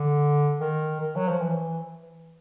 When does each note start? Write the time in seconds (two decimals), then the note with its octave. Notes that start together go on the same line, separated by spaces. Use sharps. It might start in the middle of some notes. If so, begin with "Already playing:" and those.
Already playing: D3
0.60 D#3
1.01 D#3
1.16 F#3
1.28 F3
1.41 E3